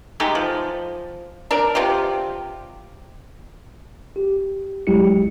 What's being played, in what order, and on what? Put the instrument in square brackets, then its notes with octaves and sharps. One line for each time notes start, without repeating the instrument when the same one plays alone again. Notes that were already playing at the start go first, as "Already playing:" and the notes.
[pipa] G#3 A3 D#4 G4
F3
D4 A#4
C3 F4 G4
[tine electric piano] G4
A1 F#3 G#3 E4 G4 C#7